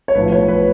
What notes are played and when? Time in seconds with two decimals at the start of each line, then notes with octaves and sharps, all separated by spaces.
0.08 C#5
0.15 B1 A2 F3 B4
0.32 C#5
0.48 B4